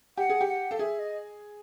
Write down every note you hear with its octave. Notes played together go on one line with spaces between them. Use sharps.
G4 F#5
G#4
G4
F#5
A4 F5
G#4 E5
D#5